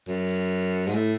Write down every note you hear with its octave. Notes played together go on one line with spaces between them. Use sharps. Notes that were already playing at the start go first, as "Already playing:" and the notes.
F#2
G#2
A2